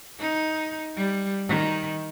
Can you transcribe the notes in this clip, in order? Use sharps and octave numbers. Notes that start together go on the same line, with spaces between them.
D#4
G3
D#3